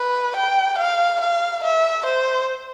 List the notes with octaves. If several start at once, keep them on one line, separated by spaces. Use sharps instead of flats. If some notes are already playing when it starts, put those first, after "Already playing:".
Already playing: B4
G5
F5
F5
E5
C5